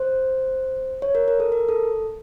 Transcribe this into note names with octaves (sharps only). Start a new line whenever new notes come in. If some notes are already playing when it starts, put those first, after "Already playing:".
Already playing: C5
C#5
A#4
A#4
A4
A#4
A4